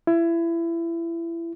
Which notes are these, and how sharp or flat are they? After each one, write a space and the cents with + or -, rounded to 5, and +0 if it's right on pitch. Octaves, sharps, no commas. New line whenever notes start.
E4 +25